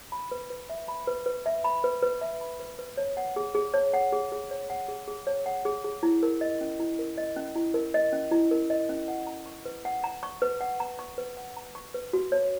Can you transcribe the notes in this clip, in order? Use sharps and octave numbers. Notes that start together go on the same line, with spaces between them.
B5
B4
B4
E5
B5
B4
B4
E5
B5
B4
B4
E5
B5
B4
B4
C#5
F#5
G#4
G#4
C#5
F#5
G#4
G#4
C#5
F#5
G#4
G#4
C#5
F#5
G#4
G#4
E4
A#4
D#5
C#4
E4
A#4
D#5
C#4
E4
A#4
D#5
C#4
E4
A#4
D#5
C#4
F#5
A#5
C#6
B4
F#5
A#5
C#6
B4
F#5
A#5
C#6
B4
F#5
A#5
C#6
B4
F#4
C#5